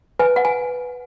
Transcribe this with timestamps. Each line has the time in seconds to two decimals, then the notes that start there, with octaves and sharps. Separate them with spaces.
0.19 B4 G#5
0.36 F#5
0.45 G#5